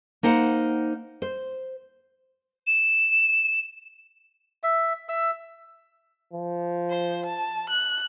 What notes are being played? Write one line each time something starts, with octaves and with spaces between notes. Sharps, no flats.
A#3 D#4 C5 F#5
C5
E7
E5
E5 E6
F3
C5
A5
F#6